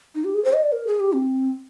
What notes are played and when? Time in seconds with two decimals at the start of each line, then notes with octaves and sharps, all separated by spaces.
0.15 D#4
0.24 G4
0.34 G#4
0.45 C5
0.53 D#5
0.63 D5
0.72 A#4
0.87 G#4
1.00 G4
1.14 C4